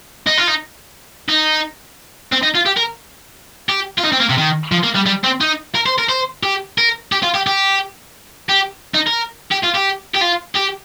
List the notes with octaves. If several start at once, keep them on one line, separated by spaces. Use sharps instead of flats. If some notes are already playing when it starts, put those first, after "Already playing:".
D#4
F4
D#4
D#4
C4
D#4
F4
G4
A#4
G4
F4
D#4
C4
A#3
C3
D#3
F3
A#3
G3
G3
C4
D#4
A#4
C5
A#4
C5
G4
A#4
G4
F4
G4
G4
G4
D#4
A#4
G4
F4
G4
G4
F4
G4